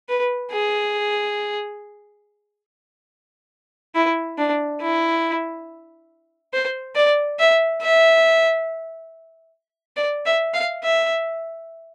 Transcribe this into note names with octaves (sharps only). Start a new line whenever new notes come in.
B4
G#4
E4
D4
E4
C5
D5
E5
E5
D5
E5
F5
E5